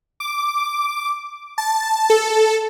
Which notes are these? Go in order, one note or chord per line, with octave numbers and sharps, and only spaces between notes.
D6
A5
A4